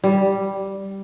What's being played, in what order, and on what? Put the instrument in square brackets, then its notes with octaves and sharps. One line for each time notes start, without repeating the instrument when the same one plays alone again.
[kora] G3